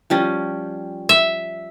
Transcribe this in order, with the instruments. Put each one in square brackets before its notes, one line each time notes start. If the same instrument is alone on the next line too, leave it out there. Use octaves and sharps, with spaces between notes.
[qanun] F3 G3 C#4
[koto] E5